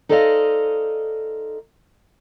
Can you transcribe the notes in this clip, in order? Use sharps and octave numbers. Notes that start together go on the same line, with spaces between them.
D#4 A4 C5 D5 D#5 F5